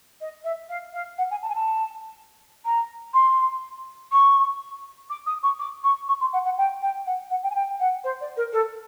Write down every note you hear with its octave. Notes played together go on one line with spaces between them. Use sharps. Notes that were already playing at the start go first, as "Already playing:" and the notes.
D#5
E5
F5
F5
F#5
G#5
A5
G#5
A5
A#5
C6
C#6
D6
D#6
C#6
D6
C#6
C#6
C6
F#5
F#5
G5
G5
F#5
F#5
G5
G#5
G5
F#5
C5
D5
A#4
A4